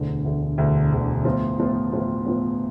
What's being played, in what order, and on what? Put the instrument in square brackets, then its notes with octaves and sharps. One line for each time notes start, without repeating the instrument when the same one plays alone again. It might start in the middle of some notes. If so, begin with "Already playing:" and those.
Already playing: [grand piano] E1 D2 D3
E1 D2 D3
E1 D2 D3
E1 D2 D3
A2 F3 B3 F4
A2 F3 B3 F4
A2 F3 B3 F4
A2 F3 B3 F4